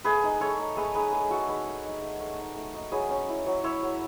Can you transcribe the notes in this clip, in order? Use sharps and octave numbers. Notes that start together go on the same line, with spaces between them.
A3 G#4 B4
D#4
A3 A4 C#5
D#4
A3 G#4 B4
D#4 G#4 B4
A3 G#4
A3 F#4 A4
D#4 G#4 B4
A3
D#4
A3
A3
D#4
A3
D#4
F#3 G#4 B4
C#4
E4
F#3
E4 C#5 E5
F#3